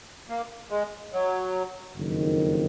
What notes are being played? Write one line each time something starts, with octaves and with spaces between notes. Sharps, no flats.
A#3
G#3
F#3
F#1 F2 D#3